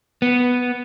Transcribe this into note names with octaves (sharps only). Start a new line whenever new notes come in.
B3